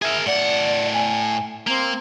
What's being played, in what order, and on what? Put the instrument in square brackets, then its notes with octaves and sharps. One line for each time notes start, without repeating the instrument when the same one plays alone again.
[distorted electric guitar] G#4 A#4 [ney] E5
[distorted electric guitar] A2 F#5 [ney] D5
[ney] G#5
[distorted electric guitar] A#3 [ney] C4